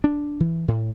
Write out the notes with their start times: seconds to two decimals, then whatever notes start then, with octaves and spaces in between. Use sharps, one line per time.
0.04 D4
0.40 E3
0.68 A2